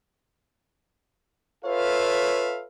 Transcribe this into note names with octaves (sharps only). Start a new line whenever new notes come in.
F4 A4 B4 C#5 E5 F5